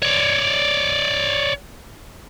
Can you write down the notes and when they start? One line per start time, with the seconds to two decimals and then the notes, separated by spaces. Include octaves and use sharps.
0.02 C#5 D5